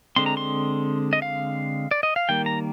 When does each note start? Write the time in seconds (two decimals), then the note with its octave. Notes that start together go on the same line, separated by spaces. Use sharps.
0.16 D3 G#3 C4 C6
0.26 A#5
0.37 C6
1.13 D#5
1.22 F5
1.91 D5
2.03 D#5
2.16 F5
2.29 D#3 G3 A#3 G5
2.46 A#5